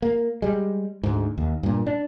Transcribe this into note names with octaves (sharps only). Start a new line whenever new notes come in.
A#3
G3 G#3
D2 G#2
D#2
G2 A#2
D4